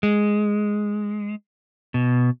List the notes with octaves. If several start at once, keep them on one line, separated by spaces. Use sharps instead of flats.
G#3
B2